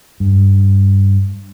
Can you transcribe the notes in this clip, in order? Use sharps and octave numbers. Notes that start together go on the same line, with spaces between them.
G2